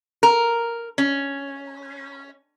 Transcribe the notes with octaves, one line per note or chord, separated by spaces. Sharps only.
A#4
C#4